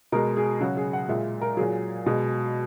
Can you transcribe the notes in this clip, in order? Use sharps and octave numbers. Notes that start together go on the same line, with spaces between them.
B2 G#3 A#4
G#4
C#3 F#3 F#4
G#4
F#5
A#2 G#3 E5
A#4
A#2 F#3 G#4
B2 G#3